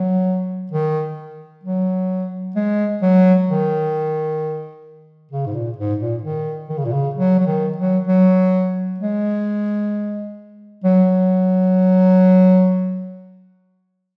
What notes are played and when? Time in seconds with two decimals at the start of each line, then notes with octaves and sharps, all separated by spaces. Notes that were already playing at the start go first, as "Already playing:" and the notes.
Already playing: F#3
0.72 D#3
1.64 F#3
2.56 G#3
3.02 F#3
3.49 D#3
5.32 C#3
5.46 G#2
5.54 A#2
5.78 G#2
6.00 A#2
6.23 D#3
6.69 D#3
6.78 C#3
6.85 A#2
6.92 C#3
7.15 F#3
7.40 F#3
7.46 D#3
7.78 F#3
8.07 F#3
9.00 G#3
10.84 F#3